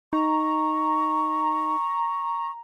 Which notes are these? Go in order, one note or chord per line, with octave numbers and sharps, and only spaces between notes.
D#4 A#5 C#6